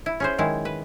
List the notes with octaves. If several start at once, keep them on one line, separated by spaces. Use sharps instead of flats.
E4
C#4 G#4 C5
D#3 F#3 G#3 E4
B4